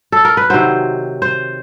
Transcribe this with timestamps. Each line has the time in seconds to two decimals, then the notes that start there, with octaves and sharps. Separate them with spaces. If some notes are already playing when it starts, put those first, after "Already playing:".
0.12 A4
0.25 A#4
0.37 B4
0.50 C3 D#3 F#3 C5
1.22 C5